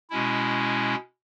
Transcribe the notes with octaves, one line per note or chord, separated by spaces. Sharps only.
B2 G#3 C#4 E4